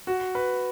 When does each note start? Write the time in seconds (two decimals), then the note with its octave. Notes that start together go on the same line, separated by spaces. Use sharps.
0.07 F#4
0.35 B4